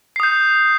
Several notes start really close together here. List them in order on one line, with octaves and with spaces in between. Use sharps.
C7 D#6 G6